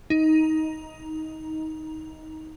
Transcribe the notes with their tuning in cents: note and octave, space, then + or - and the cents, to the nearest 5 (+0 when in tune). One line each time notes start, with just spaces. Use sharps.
D#4 +15